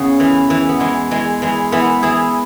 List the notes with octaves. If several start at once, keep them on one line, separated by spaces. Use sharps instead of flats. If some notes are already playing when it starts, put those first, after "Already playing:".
Already playing: E2 C#3
E3
E3
B3
E3 G#3
E3 G#3
E3 G#3
E3 B3 E4
E3 E4 G#4